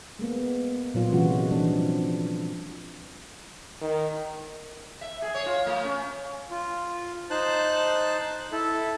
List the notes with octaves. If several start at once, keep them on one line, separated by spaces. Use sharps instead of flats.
G#3 A#3 B3
A#2 F#3 F4
C3 E3 G#3 C#4 F4 F#4
E3 F3 G3 C4 D4
D#3
E5
G#4
C#5
F4
A3
C#4
F4
D#4 C5 A5 F#6
E4 A4